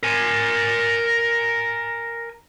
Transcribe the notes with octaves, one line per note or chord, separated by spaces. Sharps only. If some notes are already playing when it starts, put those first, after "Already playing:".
A#4 G#5